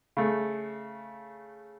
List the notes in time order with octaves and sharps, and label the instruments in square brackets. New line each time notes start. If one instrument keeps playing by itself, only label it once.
[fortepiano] C#3 A3